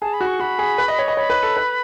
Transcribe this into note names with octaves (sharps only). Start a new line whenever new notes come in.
G#4 A5
B5
F#4
C#6
F#4 B5
G#4
B4
D#5
C#5
D#5
C#5 B5
B4
A4
B4